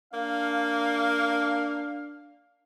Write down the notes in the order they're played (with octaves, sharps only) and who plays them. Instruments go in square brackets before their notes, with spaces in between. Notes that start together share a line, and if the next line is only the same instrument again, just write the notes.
[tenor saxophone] A#3 [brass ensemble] D4 F5